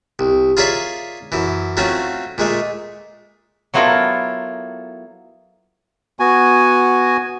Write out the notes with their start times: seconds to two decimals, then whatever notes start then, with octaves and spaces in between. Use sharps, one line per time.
0.19 C2
0.57 F4 G#4 A#4 C#5 D5 E5
1.32 F#2 E3
1.77 F#3 A3 C4 C#4 F4
2.38 A#2 G#3 A3
3.74 F#3 B3 E4 F4 A4 A#4
6.20 B3 F#4 G#5